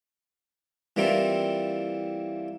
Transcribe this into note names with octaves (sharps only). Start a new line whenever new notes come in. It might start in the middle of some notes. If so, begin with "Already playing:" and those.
E3 G3 A#3 C4 E4 F4